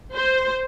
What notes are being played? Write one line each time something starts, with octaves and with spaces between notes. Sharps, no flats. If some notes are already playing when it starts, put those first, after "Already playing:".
C5